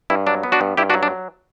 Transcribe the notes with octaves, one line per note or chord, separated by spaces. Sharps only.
G2 E4
F#3 D4
B3
D4 F#4
G2
G2 E4 G4
D4 F#4
F#3
D4